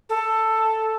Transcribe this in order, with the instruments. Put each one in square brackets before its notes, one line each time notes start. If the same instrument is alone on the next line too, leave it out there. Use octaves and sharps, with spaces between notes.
[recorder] A4